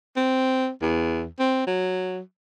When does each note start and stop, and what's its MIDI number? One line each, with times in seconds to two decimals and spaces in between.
0.16 0.70 60
0.82 1.26 40
1.39 1.65 60
1.67 2.20 54